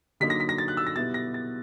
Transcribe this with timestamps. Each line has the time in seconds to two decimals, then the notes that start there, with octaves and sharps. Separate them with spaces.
0.20 D3 F#3 A#3 D#4 B6
0.30 A#6
0.40 B6
0.49 A#6
0.58 A6
0.68 F#6
0.77 E6
0.87 A#6
0.95 B2 G3 B3 E4 A6
1.14 A#6
1.34 A6